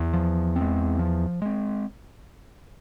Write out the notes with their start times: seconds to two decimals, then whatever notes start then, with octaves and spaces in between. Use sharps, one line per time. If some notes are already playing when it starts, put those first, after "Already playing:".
Already playing: E2
0.13 F3
0.56 C4
0.61 G#3
0.99 F3
1.42 G#3 C4